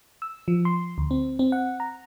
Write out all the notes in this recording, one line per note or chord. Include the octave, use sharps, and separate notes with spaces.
E6
F3
C6
D2
C4
C4
F#5
A#5